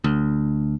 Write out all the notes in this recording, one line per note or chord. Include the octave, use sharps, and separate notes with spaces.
D2